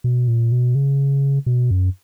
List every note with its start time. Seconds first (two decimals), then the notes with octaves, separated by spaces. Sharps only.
0.04 B2
0.28 A#2
0.52 B2
0.75 C#3
1.46 B2
1.71 F#2